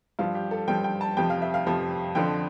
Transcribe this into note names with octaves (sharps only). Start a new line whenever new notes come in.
G2 F3 F4
G4
A4
G2 F3 G5
G5
A5
F2 C3 F3 G5
F5
E5
F5
F2 C3 F3
F2 D3 F3 G5